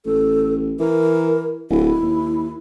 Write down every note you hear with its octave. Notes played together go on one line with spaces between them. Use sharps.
A1 A4
E3 A#4
D1 E4
D#2